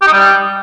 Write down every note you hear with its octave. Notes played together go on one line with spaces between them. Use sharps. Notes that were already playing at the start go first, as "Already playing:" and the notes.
G4
D#4
G3